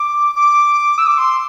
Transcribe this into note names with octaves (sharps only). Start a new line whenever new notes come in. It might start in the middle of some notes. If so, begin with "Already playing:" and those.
Already playing: D6
D6
E6
D6
C6